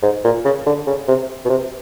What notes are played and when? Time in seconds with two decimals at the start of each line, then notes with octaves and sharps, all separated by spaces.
0.03 G#2
0.24 A#2
0.45 C#3
0.66 D3
0.87 C#3
1.08 C3
1.45 B2
1.50 C3